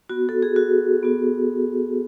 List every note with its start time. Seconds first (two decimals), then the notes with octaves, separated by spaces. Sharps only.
0.10 B3 F#4
0.29 A4
0.42 G#4
0.56 F#4
1.03 B3 F#4